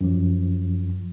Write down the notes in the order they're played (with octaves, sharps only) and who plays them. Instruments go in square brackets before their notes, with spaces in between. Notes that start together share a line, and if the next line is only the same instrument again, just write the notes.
[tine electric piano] F#2 F3